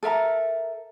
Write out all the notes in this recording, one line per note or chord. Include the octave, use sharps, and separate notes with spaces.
A4 A#4 E5 A#5